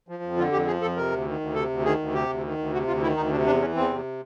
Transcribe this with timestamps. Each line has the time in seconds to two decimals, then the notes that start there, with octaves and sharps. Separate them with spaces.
0.08 F3
0.23 F2
0.38 D3 F4
0.52 F2 G4
0.67 F3 G#4
0.81 F2 A4
0.97 C3 A#4
1.12 D2
1.26 D#3
1.40 D2
1.55 C3 A4
1.70 D2
1.85 D#3 G#4
1.99 D2
2.14 C3 G4
2.29 D2
2.43 D#3
2.58 D2
2.73 C3 F#4
2.87 D2 F4
3.02 D#3 E4
3.17 D2 D#4
3.32 C3 D4
3.46 E2 D4
3.61 E3 C#4
3.75 E2 C4
3.90 C3